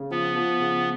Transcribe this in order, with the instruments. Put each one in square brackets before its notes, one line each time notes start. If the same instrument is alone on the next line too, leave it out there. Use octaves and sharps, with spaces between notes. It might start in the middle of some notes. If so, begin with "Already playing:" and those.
Already playing: [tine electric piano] C#3
[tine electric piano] F3 [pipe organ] B3
[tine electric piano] F3
C#3